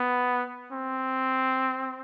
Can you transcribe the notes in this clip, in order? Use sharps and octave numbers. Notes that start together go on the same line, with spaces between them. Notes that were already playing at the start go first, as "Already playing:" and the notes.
Already playing: B3
C4